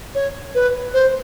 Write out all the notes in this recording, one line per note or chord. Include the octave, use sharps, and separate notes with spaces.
C#5
B4
C5